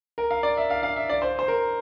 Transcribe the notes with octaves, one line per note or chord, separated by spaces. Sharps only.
A#4
F5
D5
E5
F5
F5
E5
D5
C5
C5
A#4